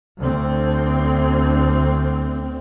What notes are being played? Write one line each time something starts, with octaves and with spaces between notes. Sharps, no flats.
D2 C4